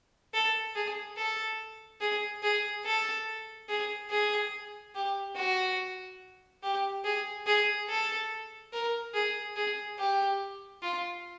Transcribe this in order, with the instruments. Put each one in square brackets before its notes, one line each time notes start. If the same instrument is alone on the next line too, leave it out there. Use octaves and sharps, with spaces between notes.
[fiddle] A4
G#4
A4
G#4
G#4
A4
G#4
G#4
G4
F#4
G4
G#4
G#4
A4
A#4
G#4
G#4
G4
F4